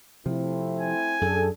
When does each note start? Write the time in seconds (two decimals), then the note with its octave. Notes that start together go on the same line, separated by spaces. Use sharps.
0.26 C3 F3 A3 C4 E4
0.80 G#5
1.21 F#2 D4 G#4 A4